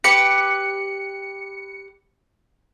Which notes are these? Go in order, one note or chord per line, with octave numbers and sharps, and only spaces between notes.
G4 B4 C#7